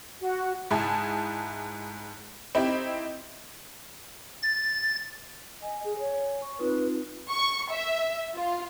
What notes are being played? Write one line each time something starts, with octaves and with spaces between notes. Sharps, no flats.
F#4
G#2 E4 G#4 A5
C4 D#4 E4 G4
A6
D#5 G#5
G#4
C#5
C#6
C4 D#4 F4 B4
C#6
E5
F4